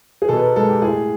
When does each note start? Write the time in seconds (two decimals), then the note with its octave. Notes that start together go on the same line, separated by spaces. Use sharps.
0.22 G#4
0.29 B2 A4
0.37 B4
0.43 A#4
0.56 G#3 A4
0.69 G4
0.82 A2 G#4